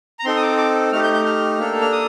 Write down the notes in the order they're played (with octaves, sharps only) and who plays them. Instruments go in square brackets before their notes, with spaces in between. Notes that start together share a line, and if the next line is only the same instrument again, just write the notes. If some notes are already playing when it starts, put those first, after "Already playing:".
[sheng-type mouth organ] A#5
C4 D#4 A4 C6
D#6
D6
D6
A3 D#4 G4 F6
G6
G6
F6
A#3 D4 A4
F6
D#6